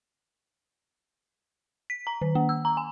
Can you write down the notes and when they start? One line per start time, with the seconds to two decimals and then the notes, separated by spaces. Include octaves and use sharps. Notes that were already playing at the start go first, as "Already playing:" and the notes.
1.90 B6
2.07 A#5
2.22 D#3
2.35 A#3
2.49 E6
2.65 A#5
2.77 G#5